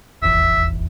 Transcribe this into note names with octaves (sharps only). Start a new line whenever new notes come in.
D#1 G#1 E2 E5